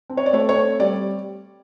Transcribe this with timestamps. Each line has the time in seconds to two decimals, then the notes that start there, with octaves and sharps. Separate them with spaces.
0.10 C4
0.17 C#5
0.26 D5
0.33 A3 C#5
0.49 C#5
0.56 C4
0.80 G3 D5